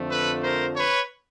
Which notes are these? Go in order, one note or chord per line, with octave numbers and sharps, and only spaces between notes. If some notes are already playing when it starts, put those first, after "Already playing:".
Already playing: F2 D3 F3 A3
A4 B4
A#4 C5
B4 C#5